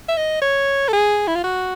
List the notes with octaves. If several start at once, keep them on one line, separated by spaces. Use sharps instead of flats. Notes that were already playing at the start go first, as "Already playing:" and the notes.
E5
D#5
C#5
A4
G#4
E4
F4
F#4